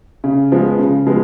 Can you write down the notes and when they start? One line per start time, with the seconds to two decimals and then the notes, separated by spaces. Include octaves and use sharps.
0.24 C#3
0.52 F3 G#3 B3
0.79 C#3
1.07 F3 G#3 B3